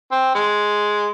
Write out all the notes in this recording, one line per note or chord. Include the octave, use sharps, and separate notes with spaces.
C4
G#3